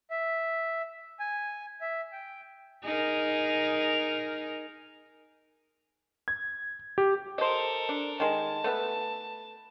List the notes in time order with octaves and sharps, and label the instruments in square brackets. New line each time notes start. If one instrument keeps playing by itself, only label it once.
[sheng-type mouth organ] E5
G#5
E5
G5
[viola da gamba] D#4 G#4 A#4
[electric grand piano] G#6
G4
[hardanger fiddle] A4 A#4 [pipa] C5 D#5
[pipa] D4
[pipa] D#3 G#3 G#4 [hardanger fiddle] A5
[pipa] A3 B3 B4